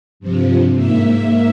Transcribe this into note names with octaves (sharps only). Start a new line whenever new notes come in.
G2 C3 F3
G#2 A#3 E5